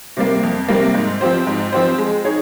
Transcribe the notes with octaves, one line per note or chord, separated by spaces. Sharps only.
C3 G3 A#3
F2
C3 G3 A#3
G#2
F3 C4 G4 C5
G#2
F3 C4 G4 C5
G#3
D#4 G#4 C#5